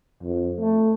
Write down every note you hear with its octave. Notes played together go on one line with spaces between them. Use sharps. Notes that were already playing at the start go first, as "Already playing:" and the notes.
F2
A3